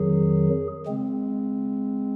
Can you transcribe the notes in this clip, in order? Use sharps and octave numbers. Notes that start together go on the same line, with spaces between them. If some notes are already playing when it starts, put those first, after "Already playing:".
Already playing: F2 D#3 F#3 G#4
C#3 G#3 C4